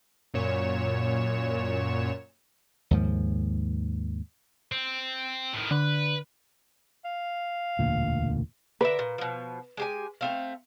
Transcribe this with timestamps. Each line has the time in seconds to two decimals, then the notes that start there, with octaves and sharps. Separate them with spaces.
0.34 F#2 A#2 C#5 E7
2.91 D#2 G#2 F3
4.72 C4
5.54 A2 D#3
5.71 D3 B4
7.05 F5
7.79 E1 D2 A#2
8.81 D3 A#4 B4 E5
8.99 A#2
9.18 B2 F3
9.77 G#3 G4 G#5
10.21 A3 C4 F5